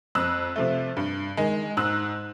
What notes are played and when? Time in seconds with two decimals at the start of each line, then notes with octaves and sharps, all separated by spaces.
0.15 F2 E6 F#6
0.56 C3 F3 A3
0.97 G2
1.37 D#3 G#3
1.77 G#2 E6 F#6